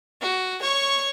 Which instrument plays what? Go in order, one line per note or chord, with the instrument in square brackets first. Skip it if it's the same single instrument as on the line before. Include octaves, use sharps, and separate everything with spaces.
[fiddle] F#4
C#5 C#6